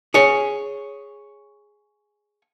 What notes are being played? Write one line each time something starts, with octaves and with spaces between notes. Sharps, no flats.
G#4 C#5